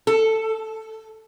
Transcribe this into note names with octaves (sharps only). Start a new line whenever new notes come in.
A4